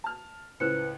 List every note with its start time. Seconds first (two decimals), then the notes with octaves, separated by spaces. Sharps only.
0.04 A5 F6
0.60 C#2 A2 B4 C5 F#6 C#7